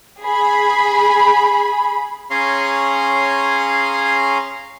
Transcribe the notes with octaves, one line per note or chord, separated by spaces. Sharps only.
G#4 B5
C#4 G#4 C#5 F5 A#5 C6